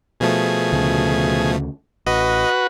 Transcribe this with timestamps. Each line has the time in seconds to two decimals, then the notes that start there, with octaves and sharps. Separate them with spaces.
0.20 B2 F3 A3 G#4
0.73 D2 C#3
2.07 A1 F#4 B4 D#5